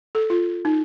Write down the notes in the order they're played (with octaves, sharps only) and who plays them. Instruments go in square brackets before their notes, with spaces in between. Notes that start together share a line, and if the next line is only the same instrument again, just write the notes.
[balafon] A4
F4
D#4